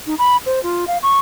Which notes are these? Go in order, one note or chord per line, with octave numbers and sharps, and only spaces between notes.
D#4
B5
C5
F4
F5
C#6